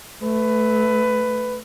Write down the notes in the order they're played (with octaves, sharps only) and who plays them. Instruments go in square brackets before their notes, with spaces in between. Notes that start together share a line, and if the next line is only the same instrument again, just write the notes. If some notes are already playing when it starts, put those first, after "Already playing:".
[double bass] A3 [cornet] B4